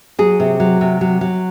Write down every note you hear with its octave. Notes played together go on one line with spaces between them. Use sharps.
F#3 G#4
C3
F#3
C3
F#3
F#3